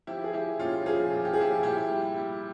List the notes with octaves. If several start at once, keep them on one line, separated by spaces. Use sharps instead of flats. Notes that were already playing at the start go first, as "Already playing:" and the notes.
F3 E4 G4
G#4
F3 E4 G4
A#2 C#4 F4
F3 F4 G#4
A#2
G4
G#4
F3 E4 G4
A#2 E4 G4
G3
G3